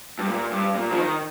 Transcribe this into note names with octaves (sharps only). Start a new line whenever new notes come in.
G2
A#2
G2
A#2
F3
D#3